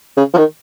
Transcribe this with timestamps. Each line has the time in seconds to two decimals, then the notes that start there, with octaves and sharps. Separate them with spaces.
0.17 C#3
0.34 F3
0.38 D#3